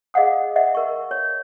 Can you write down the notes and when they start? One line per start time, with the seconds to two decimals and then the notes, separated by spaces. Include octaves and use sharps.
0.14 G#4 D#5 F5 F#5 D#6
0.56 D#5 E5 F#5
0.75 A#4 C#6
1.11 C#5